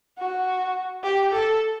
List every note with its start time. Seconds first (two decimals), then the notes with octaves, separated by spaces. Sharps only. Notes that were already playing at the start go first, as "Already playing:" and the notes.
0.19 F#4
1.04 G4
1.32 A4